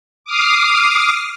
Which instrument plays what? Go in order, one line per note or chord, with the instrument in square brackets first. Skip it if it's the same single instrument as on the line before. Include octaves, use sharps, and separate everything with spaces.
[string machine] D6 D#6 F6 C7